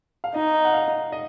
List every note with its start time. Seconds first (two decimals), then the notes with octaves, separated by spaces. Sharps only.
0.24 F5
0.34 D#4 D#5
0.65 F#5
0.73 F5
1.12 D#5